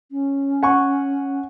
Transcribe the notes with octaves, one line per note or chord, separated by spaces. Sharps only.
C#4
F#5 G#5 C#6